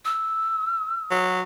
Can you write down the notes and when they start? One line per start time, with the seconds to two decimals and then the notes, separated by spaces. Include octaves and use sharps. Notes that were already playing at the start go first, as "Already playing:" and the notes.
0.05 E6
1.11 F#3